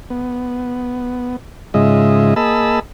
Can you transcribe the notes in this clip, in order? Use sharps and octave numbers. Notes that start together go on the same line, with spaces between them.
B3
G#2 C#3 G#3 F4 D#5 E5
A#3 G#4 D#5 A5 B5 E6